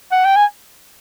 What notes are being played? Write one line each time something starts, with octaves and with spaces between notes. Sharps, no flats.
F#5
G5
G#5